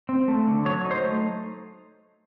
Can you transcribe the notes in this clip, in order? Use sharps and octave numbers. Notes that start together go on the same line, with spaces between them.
C4
A3
D3
F#3 C#5
D#4
C5
A3